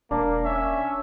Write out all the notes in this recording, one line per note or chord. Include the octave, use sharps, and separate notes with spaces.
E1 A#3 D4
C#4 E5